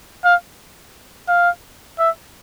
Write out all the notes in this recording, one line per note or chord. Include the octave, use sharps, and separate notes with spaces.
F5
F5
E5